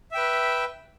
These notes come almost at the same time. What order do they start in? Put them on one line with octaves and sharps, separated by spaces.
E5 G5 B4